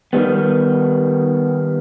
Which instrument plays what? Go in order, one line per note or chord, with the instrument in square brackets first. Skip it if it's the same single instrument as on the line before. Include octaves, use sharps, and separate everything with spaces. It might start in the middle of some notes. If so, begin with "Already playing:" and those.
[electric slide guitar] D#3 G3 B3